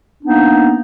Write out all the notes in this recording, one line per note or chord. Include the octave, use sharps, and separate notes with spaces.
A#3 B3 D4 D#4